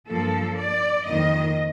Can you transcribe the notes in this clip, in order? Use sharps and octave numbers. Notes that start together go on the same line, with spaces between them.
G2 F3 A#3 A4
D5
F2 D#3 A#3 D#5